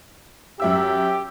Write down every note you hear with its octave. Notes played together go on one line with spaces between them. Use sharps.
F#2 G4 E5 E6